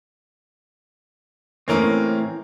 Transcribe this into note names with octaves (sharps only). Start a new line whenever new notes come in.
A2 E3 A#3 C4 C#4 A#4